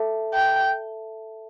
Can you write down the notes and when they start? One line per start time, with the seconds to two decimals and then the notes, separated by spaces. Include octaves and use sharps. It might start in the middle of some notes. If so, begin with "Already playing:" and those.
Already playing: A4 E5 A5
0.34 G5